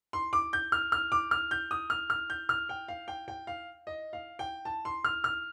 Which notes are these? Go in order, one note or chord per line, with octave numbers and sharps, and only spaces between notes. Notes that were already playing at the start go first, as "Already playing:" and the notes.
C6
D6
G6
F6
F6
D6
F6
G6
D#6
F6
F6
G6
F6
G5
F5
G5
G5
F5
D#5
F5
G5
A5
C6
F6
F6